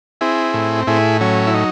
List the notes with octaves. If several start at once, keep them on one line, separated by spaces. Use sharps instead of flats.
C4 E4 G#4
A2
A2 E4 G#4
F#3 C#4
E4
D#4